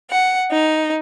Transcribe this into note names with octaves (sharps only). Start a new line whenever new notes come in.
F#5
D#4